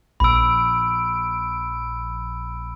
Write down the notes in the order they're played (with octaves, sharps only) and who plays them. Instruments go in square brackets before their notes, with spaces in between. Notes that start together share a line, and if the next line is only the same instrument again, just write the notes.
[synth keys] A#1 D7 [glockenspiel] B5 E6